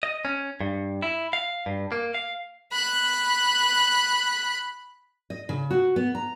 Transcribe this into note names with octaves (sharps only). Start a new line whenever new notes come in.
D#5
C#4
G2
E4
F5
G2
A#3
F5
B5 F#6
D#5
C#3
F#4
B3
A#5